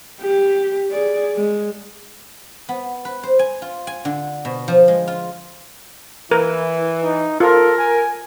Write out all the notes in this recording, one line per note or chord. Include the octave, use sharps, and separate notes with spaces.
G4
G#4 D5
G#3
B3
B4
C5
G#5
F4
G#5
D3
B2
F3
G#3
F4
E3 E4 A#4
D#4
F4 A4 A#4
G#5